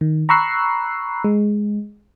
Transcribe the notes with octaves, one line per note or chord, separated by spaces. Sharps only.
D#3
A#5 B5 C#6 E6 F#6 C7
G#3